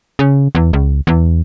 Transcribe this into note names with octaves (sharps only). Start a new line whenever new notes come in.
C#3
E2
C#2
E2